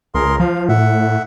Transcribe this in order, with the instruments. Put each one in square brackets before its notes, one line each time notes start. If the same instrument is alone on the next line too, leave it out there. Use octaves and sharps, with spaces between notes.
[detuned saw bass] C#2 [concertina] G#4 A#4 C6
[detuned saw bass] F3 [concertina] F5
[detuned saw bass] A2 [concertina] E5 F#5